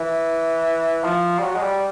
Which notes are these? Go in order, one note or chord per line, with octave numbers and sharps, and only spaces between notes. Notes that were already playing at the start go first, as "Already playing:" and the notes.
Already playing: E3
F3
G3
F#3
G#3
G3